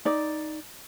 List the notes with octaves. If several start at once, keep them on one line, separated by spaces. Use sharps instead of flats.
D#4 D5